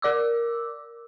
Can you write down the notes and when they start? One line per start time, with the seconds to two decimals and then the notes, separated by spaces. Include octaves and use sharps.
0.02 A#4 D5 D6 E6